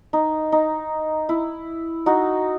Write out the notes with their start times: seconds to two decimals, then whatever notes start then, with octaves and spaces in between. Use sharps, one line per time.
0.13 D#4
0.52 D#4
1.29 E4
2.06 D#4 F#4